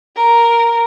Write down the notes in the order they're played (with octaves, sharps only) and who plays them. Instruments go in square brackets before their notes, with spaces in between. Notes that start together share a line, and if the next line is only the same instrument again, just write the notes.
[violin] A#4